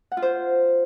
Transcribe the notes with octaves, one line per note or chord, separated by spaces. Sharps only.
F#5
F4
C5